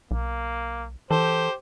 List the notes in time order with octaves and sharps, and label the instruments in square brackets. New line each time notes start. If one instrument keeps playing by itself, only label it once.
[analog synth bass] B1 [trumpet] A#3
[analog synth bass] E3 [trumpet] G4 [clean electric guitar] A4 [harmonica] C5